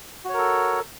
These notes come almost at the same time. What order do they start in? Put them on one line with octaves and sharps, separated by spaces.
F#4 C#5 A#4 A4